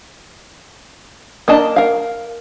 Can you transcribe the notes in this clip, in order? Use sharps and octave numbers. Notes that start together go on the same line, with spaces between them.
A#3 D4 D#5 A5
A#4 F5